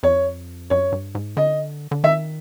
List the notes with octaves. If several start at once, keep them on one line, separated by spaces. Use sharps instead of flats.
F2 C#5
F#2 C#5
G2
G#2
D3 D#5
D3
D#3 E5